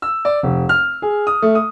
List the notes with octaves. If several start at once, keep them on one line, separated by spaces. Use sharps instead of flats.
E6
D5
F1
F6
G#4
D#6
A3
D#6